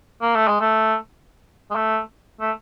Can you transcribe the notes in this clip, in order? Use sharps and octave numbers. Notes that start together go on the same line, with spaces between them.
A#3
A3
G#3
A3
G#3
A3
A3